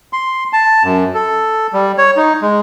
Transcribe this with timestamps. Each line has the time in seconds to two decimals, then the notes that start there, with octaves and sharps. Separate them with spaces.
0.13 C6
0.53 A5
0.83 F#2
1.14 A4
1.73 G3
1.98 C#5
2.17 D#4
2.42 G#3